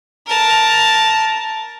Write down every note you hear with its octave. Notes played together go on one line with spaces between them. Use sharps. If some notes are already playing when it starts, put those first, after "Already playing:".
A#4 A5